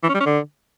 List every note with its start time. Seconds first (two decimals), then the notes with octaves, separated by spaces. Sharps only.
0.03 E3
0.09 C#4
0.15 G3
0.20 C#4
0.26 D3